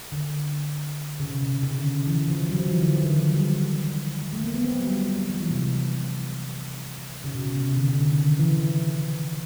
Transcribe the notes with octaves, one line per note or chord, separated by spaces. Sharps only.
D3
C#3
C3
B2
C3
C#3
D3
E3
F3
F#3
F3
E3
D3
D3
D#3
F3
F#3
G3
G#3
A3
A#3
B3
C4
F#3
G3
G#3
G3
F#3
F3
E3
C3
C#3
B2
C3
B2
C3
D3
C#3
D3
D#3
D3
E3
F3